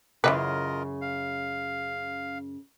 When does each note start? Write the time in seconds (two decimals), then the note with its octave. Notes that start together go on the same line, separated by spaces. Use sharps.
0.24 F#2 C#3 E3 G#3 F4 A#4 B4 D#5
1.01 F5